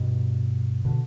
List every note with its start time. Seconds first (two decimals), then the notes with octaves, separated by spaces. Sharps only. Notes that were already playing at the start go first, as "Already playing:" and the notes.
Already playing: G2 B2
0.85 B2 D3